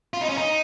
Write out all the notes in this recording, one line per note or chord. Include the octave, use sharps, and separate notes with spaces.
F4
D#4
C#4
D#4